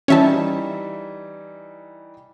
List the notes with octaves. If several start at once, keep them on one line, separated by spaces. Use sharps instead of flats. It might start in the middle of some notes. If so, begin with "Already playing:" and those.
E3 G3 C#4 D#4 E5 A5